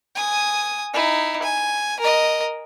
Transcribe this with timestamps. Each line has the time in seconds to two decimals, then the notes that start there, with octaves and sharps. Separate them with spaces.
0.15 G#5 D#6
0.93 D#4 E4
1.42 G#5
2.00 A#4 D#5